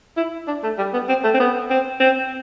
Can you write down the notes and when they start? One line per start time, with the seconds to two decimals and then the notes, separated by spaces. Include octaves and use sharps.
0.17 E4
0.48 D4
0.63 A3
0.78 G3
0.93 B3
1.09 C4
1.24 A3
1.35 C4
1.40 B3
1.71 C4
2.00 C4